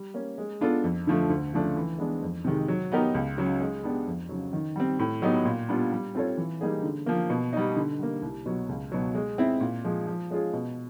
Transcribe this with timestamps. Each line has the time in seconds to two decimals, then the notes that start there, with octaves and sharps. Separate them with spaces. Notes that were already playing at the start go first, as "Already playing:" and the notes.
Already playing: G3
0.14 A#3 C#4
0.38 G#3
0.61 B3 D4 F4 A4
0.84 F2
1.07 D3 F3 A3
1.30 D2
1.53 C#3 F3 A3 D4
1.76 E3
1.99 G#3 B3 D4
2.22 F2
2.45 C3 D#3 G#3
2.68 F#3
2.92 B3 D#4 G4 A#4
3.15 C#2
3.38 C#3 F#3
3.60 G#3
3.83 B3 D4 G4
4.07 F2
4.29 C#3 F#3
4.53 D#3
4.76 G3 C4
4.99 A2
5.22 F#3 B3 D#4 G4
5.45 A#2
5.69 G3 B3 D4 F4
5.92 G3
6.15 C4 F4 A4 C#5
6.37 E3
6.61 G3 A#3 D#4 G#4
6.83 D3
7.06 F3 A#3
7.30 B2
7.53 G3 B3 D#4
7.76 D3
7.99 G3 A#3
8.22 C2
8.46 B2 F#3
8.69 C#2
8.92 B2 F#3
9.15 G#3
9.38 C4 E4
9.61 A#2
9.84 F3 G#3
10.07 F3
10.31 G#3 C#4 F4 G#4
10.53 B2